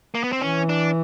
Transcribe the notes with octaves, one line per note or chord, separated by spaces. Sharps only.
A#3
B3
C4
E3 C#4
D4